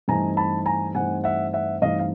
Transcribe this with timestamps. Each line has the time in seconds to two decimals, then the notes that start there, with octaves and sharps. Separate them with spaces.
0.08 G2 E3 A3 C4 D#4 G#5 A#5
0.37 A5 B5
0.66 G#5 A#5
0.95 G2 E3 A3 C4 D#4 F#5 G#5
1.24 E5 F#5
1.53 E5 F#5
1.82 G2 E3 A3 C4 D#4 D#5 F5
1.99 F5